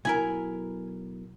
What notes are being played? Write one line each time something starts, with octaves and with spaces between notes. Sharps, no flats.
B1 E4 A#4 G#5